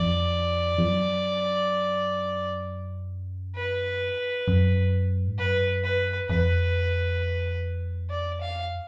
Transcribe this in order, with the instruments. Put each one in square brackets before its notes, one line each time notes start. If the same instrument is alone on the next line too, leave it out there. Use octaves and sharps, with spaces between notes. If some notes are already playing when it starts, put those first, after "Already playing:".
Already playing: [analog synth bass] F2 [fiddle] D5
[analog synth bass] F2
F#2
[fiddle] B4
[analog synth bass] F#2
G#2
[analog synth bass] F#2 [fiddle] B4
[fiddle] B4
[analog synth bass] F2 [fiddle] B4
[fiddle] D5
F5